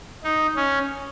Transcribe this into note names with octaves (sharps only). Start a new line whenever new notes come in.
D#4
C#4